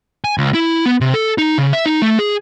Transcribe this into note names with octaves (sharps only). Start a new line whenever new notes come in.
G#5
C#2
E4
B3
C3
A4
D#4
C#3
E5
D#4
A3
G#4